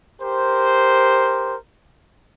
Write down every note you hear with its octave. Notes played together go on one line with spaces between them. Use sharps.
G4 A#4 C5